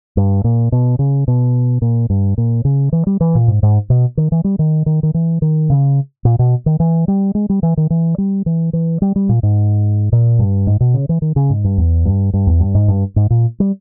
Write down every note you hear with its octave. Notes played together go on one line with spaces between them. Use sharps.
G2
A#2
B2
C#3
B2
A#2
G2
A#2
C#3
E3
G3
E3
A#2
G#2
G#2
B2
D#3
E3
G3
D#3
D#3
D#3
E3
D#3
C#3
A#2
B2
D#3
E3
G3
G#3
G3
E3
D#3
E3
G3
E3
E3
G3
G3
A#2
G#2
A#2
G2
G#2
B2
C#3
E3
D#3
C#3
G#2
G2
E2
G2
G2
E2
G2
G#2
G2
G#2
A#2
G3